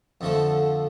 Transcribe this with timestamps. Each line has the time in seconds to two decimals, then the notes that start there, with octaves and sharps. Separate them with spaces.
0.21 F2 D3 F3 A3